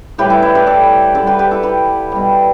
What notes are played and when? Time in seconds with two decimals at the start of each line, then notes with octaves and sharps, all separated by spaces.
0.18 A2 E3 G3 G4 B4
0.30 E4 A4
0.42 E4
0.55 G4 B4
0.67 A4 D5
1.15 D3 G3 A4 D5
1.27 G4 B4
1.39 G4 B4
1.51 E4 A4
1.63 G4 B4
2.12 B2 G3